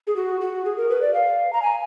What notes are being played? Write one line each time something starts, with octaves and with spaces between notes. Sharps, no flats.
G#4
F#4
F#4
G#4
A#4
B4
D5
F5
A#5
G#5